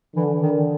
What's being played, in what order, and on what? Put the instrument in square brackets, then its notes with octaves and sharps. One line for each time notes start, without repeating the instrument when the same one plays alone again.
[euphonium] D3 [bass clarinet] E3
[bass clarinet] D#3